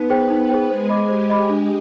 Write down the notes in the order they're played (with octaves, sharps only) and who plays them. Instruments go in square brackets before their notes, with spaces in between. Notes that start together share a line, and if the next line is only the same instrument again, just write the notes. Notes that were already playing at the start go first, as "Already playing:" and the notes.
Already playing: [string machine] B3 B4 [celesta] D#4
[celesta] G#4 C5 G5
D#4
G#4 C5 G5
[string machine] G#3 G#4 [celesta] C5
[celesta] D#5 B5 D6
[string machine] G4 [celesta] C5
[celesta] D#5 B5 D6
D4